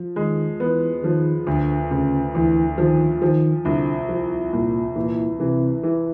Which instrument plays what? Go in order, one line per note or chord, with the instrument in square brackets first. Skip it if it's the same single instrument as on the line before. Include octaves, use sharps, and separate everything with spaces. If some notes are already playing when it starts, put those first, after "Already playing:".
Already playing: [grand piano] F3
[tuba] D#3 [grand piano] G#3
[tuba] E3 [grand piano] B3
[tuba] D#3 [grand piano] F3
[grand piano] D2 [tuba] D3
[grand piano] D2 [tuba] C#3
[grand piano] D2 [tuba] E3
[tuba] D#3 [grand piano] F3
[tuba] D#3 [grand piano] F3
[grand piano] C2 [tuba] D3
[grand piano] F3
[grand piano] C2 [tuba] A#2
[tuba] A#2 [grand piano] E3
[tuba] C3 [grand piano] E3
[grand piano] E3